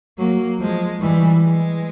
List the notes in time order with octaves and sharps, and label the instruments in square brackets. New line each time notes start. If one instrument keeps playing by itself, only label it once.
[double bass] F#3 [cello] A#3
[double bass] F3 [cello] G#3
[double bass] E3 [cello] G3
[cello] G#3